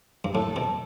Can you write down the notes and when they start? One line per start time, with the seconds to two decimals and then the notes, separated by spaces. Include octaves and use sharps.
0.25 G2
0.34 A2 A4
0.56 B2